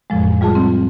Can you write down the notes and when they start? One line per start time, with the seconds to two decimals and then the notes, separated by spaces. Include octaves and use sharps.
0.10 F2 A2 F3 G#3
0.41 G3 F4 G#4 A5
0.55 C4